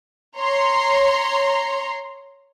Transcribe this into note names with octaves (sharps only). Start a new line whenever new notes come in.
C#5 A#5 C6